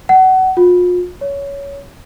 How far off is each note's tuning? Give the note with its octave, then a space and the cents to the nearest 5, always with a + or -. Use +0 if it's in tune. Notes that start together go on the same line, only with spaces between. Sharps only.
F#5 +25
F4 +40
C#5 +15